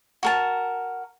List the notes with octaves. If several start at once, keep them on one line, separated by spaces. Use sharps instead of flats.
F#4 A#4 A5